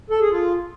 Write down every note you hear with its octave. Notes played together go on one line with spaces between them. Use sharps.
A4
G#4
F4